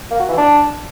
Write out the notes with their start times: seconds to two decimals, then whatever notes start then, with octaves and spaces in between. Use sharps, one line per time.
0.10 A#3
0.19 F#4
0.28 E3
0.37 D4